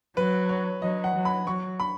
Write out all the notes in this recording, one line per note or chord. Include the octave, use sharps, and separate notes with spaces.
F#3 B4
C#5
F#3 D#5
F#5
F#3
B5
F#3 C#6
B5